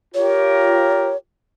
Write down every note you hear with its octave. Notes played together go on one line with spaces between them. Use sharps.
F4 G4 A#4 C#5